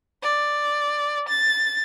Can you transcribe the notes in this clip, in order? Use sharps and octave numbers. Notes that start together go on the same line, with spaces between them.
D5
A6